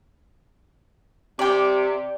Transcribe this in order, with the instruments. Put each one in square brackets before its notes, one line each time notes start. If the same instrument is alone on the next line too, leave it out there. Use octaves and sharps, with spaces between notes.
[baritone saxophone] C3 [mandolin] D5 G5